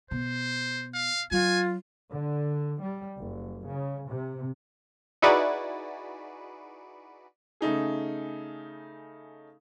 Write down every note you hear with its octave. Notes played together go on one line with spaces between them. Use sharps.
B2 C5
F5
F#3 F4 G#5
D3
G3
F#1
C#3
C3
D#4 E4 F#4 G#4 B4 D5
C#3 A3 D#4 G#4